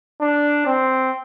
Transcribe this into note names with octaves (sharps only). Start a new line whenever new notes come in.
D4
C4